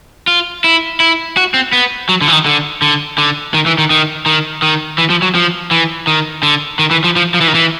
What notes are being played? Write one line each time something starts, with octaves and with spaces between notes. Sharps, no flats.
F4
E4
E4
F#4
C4
B3
F#3
D3
E3
D#3
D3
D3
D3
D#3
E3
D#3
D#3
D#3
D#3
E3
F3
F#3
F3
E3
D#3
D3
D#3
E3
F3
F3
F3
E3
D#3
E3